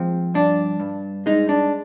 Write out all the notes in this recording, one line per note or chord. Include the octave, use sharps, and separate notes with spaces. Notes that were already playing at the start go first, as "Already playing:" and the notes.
Already playing: F3 G#3 C4
G2 D4
G2
G#3 D#4
D4